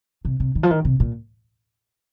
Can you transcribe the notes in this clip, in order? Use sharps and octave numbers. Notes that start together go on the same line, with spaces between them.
C3
C3
D#3
F3
D#3
C3
A#2